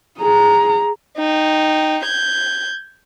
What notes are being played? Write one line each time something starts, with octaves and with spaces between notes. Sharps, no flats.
G#4 A#5
D#4 G5
G6 G#6